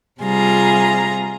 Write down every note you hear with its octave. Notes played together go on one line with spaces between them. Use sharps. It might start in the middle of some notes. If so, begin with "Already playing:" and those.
C3 G3 F4 G#4 A#5